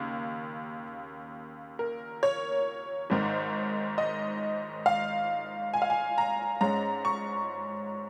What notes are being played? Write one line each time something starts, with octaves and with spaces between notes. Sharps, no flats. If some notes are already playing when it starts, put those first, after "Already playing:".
Already playing: D#2 C#3 A#3
A#4
C#5
G#1 G#2 D#3
D#5
F5
G#5
F5
G#5
A#5
G#2 G#3 C#4 A#5
C#6